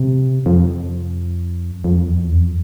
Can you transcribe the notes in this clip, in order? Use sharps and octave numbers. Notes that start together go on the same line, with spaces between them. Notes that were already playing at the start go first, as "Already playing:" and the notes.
Already playing: C3
F2
F2
E2
F2